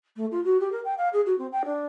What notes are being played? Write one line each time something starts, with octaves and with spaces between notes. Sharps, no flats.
A3
F4
F#4
G4
A#4
G5
F5
G#4
F#4
C4
G5
D4